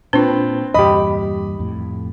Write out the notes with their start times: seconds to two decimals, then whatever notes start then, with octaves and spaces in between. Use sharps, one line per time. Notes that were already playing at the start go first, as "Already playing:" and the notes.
0.13 A#2 C4 D4 F4 B4
0.74 E2 G2 A#2 G4 D#5 B5
1.59 F2 A2